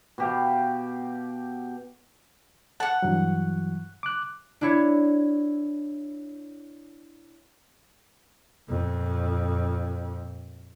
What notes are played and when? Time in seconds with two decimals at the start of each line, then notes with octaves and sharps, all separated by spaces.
0.18 B2 G4 F5
2.80 F#5 A5 C#6
3.02 G2 E3 F#3
4.03 D6 F#6
4.61 D4 E4 C#5
8.68 F2 A#2